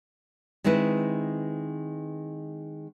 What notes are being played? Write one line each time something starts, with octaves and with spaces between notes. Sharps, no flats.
D#3 G#3 C4 E4 B4